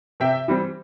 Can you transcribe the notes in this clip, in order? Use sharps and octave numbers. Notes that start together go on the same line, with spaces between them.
C3 E5 G5
E3 G3 C4